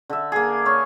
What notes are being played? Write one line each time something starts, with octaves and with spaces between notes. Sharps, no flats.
D3 E5
A#3 G#4
C#5 F5 B5